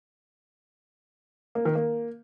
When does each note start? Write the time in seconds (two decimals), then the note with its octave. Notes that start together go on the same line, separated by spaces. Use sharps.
1.55 A#3
1.65 D#3
1.75 A#3